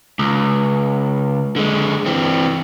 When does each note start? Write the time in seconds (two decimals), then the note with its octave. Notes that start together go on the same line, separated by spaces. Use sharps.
0.19 C#2
1.56 D3 G#3
2.06 E3 C4